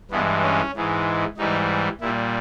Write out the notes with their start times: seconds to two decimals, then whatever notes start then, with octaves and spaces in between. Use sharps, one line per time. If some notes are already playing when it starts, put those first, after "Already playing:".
0.11 G2 E3 G#3 B3
0.43 C#4
0.74 G#2 E3 G#3
1.37 G#2 E3 G3 D#4
2.01 A#2 G3 E4